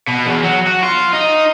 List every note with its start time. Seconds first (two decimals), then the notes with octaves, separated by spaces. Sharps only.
0.08 B2
0.27 E2
0.44 F#3
0.67 F#4
0.83 F4
1.13 D#4